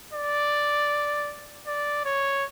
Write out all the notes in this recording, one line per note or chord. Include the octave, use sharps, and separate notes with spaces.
D5
D5
C#5